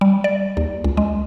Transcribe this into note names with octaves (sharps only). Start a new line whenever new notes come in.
G3
D5
D#2
C#2
G#3